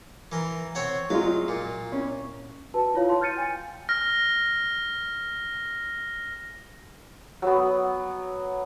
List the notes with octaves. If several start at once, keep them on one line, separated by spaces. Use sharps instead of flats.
E3 A#4 C6
C4 C#5 F#5
F#3 G#3 F4 F5
A#2
C#4
F#4 B4 A5
E4 F4 C#5 F5
F5 A5 C6
F6 G6 A6 C#7 D#7
G5 G#5
F6 A#6
F#3 B3